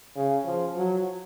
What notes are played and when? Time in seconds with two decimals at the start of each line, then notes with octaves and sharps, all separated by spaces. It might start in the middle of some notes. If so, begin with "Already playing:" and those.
0.16 C#3
0.45 F3
0.76 F#3